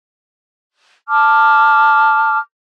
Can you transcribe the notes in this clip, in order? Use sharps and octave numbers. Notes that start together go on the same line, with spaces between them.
A5 D6 F6